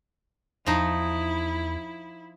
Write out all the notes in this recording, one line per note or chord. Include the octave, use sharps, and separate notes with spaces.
E2 F3 D#4 E4